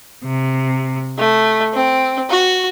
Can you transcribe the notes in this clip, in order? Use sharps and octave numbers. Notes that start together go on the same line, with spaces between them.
C3
A3
C4
F#4